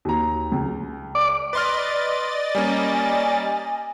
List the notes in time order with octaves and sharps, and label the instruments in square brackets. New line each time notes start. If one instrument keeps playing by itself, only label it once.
[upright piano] D#2 A#5
C#2
[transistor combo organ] D5
[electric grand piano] B4 C6 F6 [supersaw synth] D5 D#5 A6
[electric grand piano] G3 A#3 C#4 [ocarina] G#5